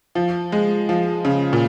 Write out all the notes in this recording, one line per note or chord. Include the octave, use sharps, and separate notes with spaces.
F3
G#3
F3
C#3
A#2